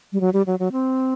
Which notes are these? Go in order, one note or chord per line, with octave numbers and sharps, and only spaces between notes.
G3
F#3
G3
F#3
F#3
C4